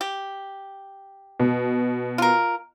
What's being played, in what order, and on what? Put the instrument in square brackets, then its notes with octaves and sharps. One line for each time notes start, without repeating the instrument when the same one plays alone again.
[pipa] G4
[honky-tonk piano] B2
[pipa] F4 A#4